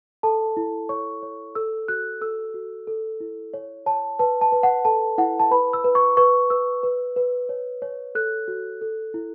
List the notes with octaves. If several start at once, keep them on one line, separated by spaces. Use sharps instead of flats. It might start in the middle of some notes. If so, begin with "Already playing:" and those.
A4 A5
E4
C#5 C#6
C#5
A4 E6
F#4 F#6
A4 E6
F#4
A4
E4
C#5
C#5 A5
B4 A5
A5
B4
F#5
A4 A5
E4 F#5
A5
B4 B5
E6
B4
C#6
B4 C#6
B4 E6
B4
B4
C#5
C#5
A4 F#6
F#4
A4
E4